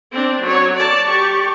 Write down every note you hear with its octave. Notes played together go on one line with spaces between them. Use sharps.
C4 D4
F#3 C#5
D5 A5
G4 C#6